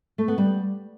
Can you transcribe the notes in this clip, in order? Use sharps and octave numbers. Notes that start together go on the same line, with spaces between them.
A3
B3
G3